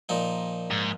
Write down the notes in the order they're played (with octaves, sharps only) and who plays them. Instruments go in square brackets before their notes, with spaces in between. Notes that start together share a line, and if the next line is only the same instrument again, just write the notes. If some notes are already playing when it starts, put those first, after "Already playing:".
[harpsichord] A#2 F3 D#4
[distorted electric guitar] G#2